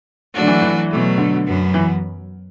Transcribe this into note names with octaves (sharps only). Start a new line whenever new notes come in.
F#3 A3 D4 F#4
D3
E3
E3
B2 F#3 A3
D3
F#2 F#3 B3
E3